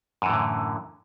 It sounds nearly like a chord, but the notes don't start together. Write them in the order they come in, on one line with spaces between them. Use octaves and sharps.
F#2 E3 A2 D3